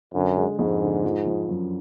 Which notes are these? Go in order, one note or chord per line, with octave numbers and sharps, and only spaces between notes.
F#2 D3
G#3
F2 G#2
D3
F3
F3
F#2